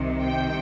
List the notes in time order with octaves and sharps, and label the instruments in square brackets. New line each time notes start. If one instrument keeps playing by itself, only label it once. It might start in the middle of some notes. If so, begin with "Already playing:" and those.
Already playing: [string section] C2 C3 D#3
G5